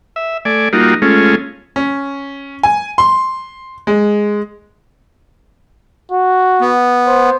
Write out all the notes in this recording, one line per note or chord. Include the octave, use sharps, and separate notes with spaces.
E5
A3 D5 G#5
G3 A#3 D#4 F4 F#4
G#3 A3 C#4 F4
C#4
G#5
C6
G#3
F#4
B3
C5